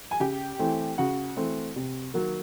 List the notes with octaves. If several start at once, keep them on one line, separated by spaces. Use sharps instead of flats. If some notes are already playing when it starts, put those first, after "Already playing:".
G#5
C#3 G4 G5
E3 A3 C4
C#3 F#4 F#5
E3 A3 C4
C3
D#3 F#3 A#3